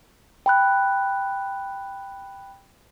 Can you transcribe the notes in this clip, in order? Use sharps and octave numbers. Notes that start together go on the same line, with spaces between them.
G5 B5 F#6